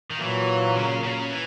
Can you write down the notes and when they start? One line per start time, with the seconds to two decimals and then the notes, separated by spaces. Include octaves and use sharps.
0.10 D#3
0.21 A#2 E3 F#3 A#3
0.76 C#3
1.03 C#3
1.31 E3